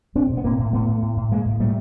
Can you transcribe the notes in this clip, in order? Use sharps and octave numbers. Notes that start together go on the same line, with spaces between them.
B2 C4 D4
B2
B3
A2 A#3 C4
A2
A2 A3 B3
A2
A2
A2
A2 G#3 A#3
A2
A#2 G3 A3